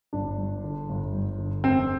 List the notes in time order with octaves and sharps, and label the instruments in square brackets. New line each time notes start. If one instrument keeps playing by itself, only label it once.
[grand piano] G1 [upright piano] D4
[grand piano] G2
D3
G1
G2
D3
[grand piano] F1 [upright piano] C4